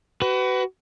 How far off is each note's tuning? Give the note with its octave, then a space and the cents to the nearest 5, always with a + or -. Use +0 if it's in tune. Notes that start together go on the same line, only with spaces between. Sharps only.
F#4 +35 B4 +20